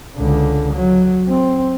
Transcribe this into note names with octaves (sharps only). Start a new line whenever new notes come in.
C#2 D3
F#3
C4